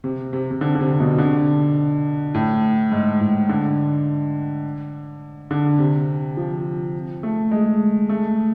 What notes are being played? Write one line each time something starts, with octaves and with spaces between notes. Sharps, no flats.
C3
C3
C3
D3
D3
C3
B2
D3
A2
G#2
A2
D3
D3
C3
F3
A3
G#3
A3